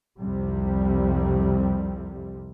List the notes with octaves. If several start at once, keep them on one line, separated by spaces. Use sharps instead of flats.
C2 F2 C3 G3